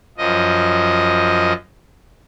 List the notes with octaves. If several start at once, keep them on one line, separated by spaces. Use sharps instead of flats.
F#2 F3 D#5